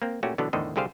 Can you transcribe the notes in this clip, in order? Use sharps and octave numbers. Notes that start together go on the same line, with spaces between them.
A#3 C4
A#2 A3 C#4 F#4 G4
B2 D3 E3 F#3 B3 D4
E2 A2 D3 D#3 C5 D#5
C2 D3 G4 G#4 C5 F5